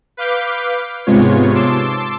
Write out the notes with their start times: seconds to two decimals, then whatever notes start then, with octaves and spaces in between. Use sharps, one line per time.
0.17 B4 F5 D6 G6 B6
1.06 G#2 C3 G#3 B3 F4 C#5
1.55 A5 C6 D6 E6